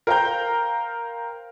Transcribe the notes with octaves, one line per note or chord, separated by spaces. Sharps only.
A#4 C5 F5 G5 A#5 G6